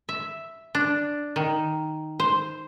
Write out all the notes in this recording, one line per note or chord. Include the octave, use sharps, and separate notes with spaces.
E5
D4
D#3
C5